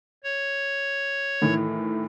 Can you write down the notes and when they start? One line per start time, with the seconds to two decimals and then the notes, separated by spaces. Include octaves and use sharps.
0.24 C#5
1.42 A2 D#3 E3